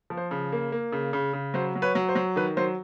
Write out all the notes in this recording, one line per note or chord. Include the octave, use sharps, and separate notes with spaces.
F3
C5
C#3
A#3
A#3
C#3
C#3
C#3
F#3 C5
F#3
B4 C#5
F#3
C5
F#3
D#3 B4
F#3 C5